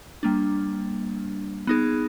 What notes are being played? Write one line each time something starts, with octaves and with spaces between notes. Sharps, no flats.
G3 A#3 D4
B3 D#4 G#4